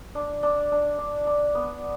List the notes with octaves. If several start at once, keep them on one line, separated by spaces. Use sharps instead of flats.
D4
D4
D4
D4
D4
B3